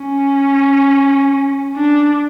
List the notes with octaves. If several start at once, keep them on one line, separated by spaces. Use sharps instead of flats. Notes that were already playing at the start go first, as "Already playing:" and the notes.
Already playing: C#4
D4